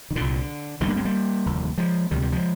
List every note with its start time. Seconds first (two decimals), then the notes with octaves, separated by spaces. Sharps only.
0.11 D#3
0.16 C2 A#2 D3
0.80 G1 G2 D3 D#3
0.88 A#3 D4
0.96 G#3 C4
1.05 G3 A#3
1.46 F1 D#2 D3
1.78 F3 G#3
2.11 D2 C3 D#3 G3
2.22 D#3 G3
2.32 F3 G#3